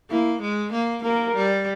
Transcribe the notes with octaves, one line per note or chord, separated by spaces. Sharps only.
A#3 E4
G#3
A#3
A#3 A#4
G3